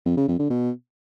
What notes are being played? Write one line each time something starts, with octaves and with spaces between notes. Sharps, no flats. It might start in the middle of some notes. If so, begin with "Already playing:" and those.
F2
C#3
F2
D3
B2